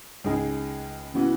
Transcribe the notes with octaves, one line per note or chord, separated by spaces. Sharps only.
C#2 C#3 G#3 D#4 G#4
C#3 E3 B3 F#4